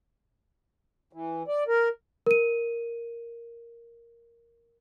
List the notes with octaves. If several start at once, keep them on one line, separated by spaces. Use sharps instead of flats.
E3
D5
A#4
A#4 D#7